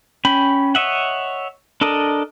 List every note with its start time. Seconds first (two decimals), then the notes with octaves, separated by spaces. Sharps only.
0.25 C#4 G5 B5
0.75 C#5 D#5 E5 F#5
1.81 D4 A4 A#4 D#5